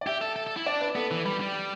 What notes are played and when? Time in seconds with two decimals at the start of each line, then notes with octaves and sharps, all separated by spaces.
0.01 D5
0.07 G4 E5
0.21 A4
0.36 A4
0.47 A4
0.56 E4
0.66 D4 D5
0.81 B4
0.96 B3 A4
1.11 E3 B4
1.26 G3 B5
1.40 G3